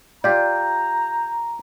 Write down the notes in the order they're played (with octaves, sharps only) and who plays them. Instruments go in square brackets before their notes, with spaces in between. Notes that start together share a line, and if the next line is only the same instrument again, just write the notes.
[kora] F4 G4 [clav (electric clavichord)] D5 [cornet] A#5 [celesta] G6